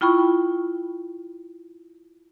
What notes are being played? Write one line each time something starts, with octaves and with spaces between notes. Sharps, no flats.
E4 F4 G5 B5 C#6